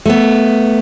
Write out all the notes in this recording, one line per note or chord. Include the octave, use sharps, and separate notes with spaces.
A3 B3